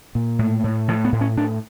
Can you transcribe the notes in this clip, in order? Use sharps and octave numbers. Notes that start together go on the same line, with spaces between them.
A#2
A2
A2
A2 F3
B3
A2
C#4
A2 D4